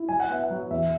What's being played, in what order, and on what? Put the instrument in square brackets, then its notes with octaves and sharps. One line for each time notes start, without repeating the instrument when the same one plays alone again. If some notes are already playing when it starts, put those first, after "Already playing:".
Already playing: [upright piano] E4
[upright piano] F#3 [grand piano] G#5
[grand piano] F#5
[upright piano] B3 [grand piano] E5
[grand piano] F#5
[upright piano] F#3
[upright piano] E2 [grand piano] E5